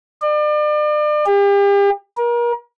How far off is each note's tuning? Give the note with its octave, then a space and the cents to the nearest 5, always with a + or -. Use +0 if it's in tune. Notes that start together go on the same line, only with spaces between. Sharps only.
D5 +40
G4 +40
A#4 +35